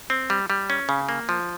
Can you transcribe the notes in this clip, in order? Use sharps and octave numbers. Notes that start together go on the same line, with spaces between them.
C4
G3
G3
C#4
C#3
A#3
F3